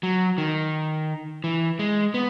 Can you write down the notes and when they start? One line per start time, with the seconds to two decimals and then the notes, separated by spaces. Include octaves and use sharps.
0.03 F#3
0.38 D#3
1.44 E3
1.79 G#3
2.14 B3